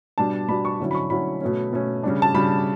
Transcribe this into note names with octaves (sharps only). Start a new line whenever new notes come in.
B2 G3 D4 A5
B2 G3 D4 B5
C#6
D3 F#3 C#4 E4
B5
C#6
D3 F#3 C#4 E4 B5
B2 A3 C#4
B2 A3 C#4
C#3 G3 D4
A5
C#3 G3 D4 B5